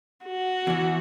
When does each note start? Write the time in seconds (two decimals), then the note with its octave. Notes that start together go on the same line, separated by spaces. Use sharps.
0.25 F#4
0.67 E2 E3